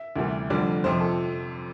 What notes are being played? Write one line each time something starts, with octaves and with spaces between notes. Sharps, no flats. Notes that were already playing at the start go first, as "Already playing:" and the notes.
Already playing: E5
D2 C3 E3 G3
F1 F2 D3 G3 D5
F2 C3 F3 C5
A4